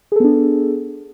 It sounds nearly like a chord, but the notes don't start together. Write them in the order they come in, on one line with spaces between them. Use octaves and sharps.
G#4 A4 B3 D4